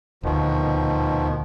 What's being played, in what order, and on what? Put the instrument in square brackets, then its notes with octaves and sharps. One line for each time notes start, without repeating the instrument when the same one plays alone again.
[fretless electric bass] D#1 D2 [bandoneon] B2 D#3 F3